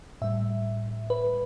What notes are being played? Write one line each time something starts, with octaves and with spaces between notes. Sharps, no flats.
A2 G3 E5
B4